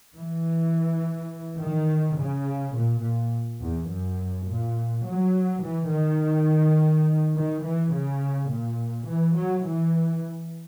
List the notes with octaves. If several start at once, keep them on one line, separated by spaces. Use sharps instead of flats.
E3
D#3
C#3
A#2
A#2
E2
F#2
A#2
F#3
E3
D#3
D#3
E3
C#3
A#2
E3
F#3
E3